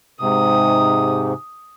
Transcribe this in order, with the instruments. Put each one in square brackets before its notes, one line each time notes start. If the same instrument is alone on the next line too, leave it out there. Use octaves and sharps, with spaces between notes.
[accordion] G#2 C3 [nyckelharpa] D#6